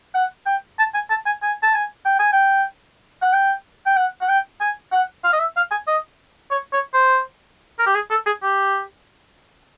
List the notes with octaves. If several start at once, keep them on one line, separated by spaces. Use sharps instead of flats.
F#5
G5
A5
G#5
A5
G#5
G#5
A5
G#5
G5
G#5
G5
F#5
G5
G5
F#5
F#5
G5
G#5
F#5
F5
D#5
E5
F5
G#5
D#5
C#5
C#5
C5
A#4
G4
G#4
A4
G#4
G4